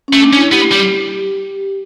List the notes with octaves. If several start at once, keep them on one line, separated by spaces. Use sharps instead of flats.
A3 C#4
D4
C#4
E4
B3 G4
G3